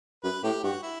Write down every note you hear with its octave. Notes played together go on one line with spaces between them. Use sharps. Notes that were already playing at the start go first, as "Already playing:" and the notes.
F#2 B4
A2 G4
G2 F#4
E4